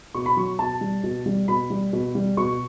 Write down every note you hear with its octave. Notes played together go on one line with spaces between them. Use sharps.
B2 C#6
B5
F#3 C#6
B2 A5
G3
B2
G3
B2 B5
G3
B2
G3
B2 C#6